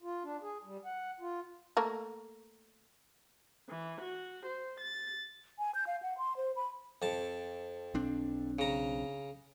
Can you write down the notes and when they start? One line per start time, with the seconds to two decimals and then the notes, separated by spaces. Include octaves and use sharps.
0.02 F4
0.24 D4
0.42 G#4
0.65 G3
0.85 F#5
1.20 F4
1.77 A3 A#3 A#4
3.68 E3
4.02 F#4
4.46 C5
4.80 A6
5.59 G#5
5.75 G6
5.87 F5
6.03 F#5
6.18 C6
6.37 C5
6.56 B5
7.02 F2 A5
7.94 B1 C4 D4
8.59 C#3 A#5